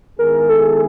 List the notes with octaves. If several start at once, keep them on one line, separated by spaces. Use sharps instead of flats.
D#3 G#3 B3 E4 G#4 A#4
A4